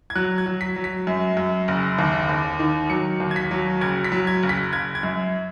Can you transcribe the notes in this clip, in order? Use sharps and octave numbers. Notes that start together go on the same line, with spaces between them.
G#6
F#3 F#6
G#6
F#3
B6
F#3
B6
F#2
F#2
F#1
D#2
D#2
D#3
F#3 C#7
D#2
G#6
B6
F#3
F#1 G#6
B6
F#3
G#6
F#1
B6
F#1 G#6
G#6
F#2